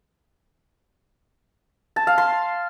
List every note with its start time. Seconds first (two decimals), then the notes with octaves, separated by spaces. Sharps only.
1.96 A5
2.07 F5
2.18 C6